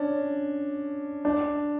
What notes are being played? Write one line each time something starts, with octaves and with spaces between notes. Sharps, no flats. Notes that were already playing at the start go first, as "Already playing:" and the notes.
Already playing: C#4 D4
D4